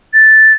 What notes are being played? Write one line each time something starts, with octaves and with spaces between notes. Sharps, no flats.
A6